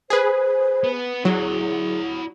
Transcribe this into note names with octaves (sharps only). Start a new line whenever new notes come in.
G#4 B4 C5
B3
F#3 E4 G#4 D5